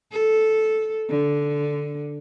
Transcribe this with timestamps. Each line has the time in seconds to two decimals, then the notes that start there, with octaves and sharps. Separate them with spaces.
0.11 A4
1.09 D3